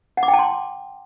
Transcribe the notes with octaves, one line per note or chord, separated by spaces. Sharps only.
F#5
D6
G5
A5
C6